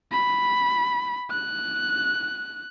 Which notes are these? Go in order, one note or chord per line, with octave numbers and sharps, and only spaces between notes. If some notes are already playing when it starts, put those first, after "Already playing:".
B5
F#6